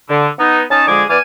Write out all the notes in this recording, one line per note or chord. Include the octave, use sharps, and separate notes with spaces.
D3
B3 D#4
C#4 D#4 A5
D3 F3 G#3 G#4 G#5 D6
E3 B3 D5 G#5 D6 F6